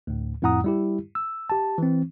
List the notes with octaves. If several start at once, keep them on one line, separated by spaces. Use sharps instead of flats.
D2 A2
F2 A2 E4 F#5 A#5 D#6
G3 E4 G4
E6
G4 A5
E3 C4